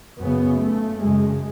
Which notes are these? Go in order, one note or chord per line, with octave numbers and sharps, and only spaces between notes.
F#2 C#3 B3
A3
F#2 C#3 G#3